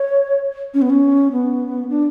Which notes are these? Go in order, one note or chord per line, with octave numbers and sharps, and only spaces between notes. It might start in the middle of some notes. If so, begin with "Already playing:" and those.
Already playing: C#5
C#4
B3
C#4
B3
D4